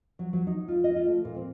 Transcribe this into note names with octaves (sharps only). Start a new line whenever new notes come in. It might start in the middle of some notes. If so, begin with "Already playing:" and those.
F#3
F#3
D#4
F4
D#5
F4
A3
A#2
C4